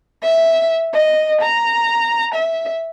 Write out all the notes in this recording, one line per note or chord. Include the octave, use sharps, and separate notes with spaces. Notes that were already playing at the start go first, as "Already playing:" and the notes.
E5
D#5
A#5
E5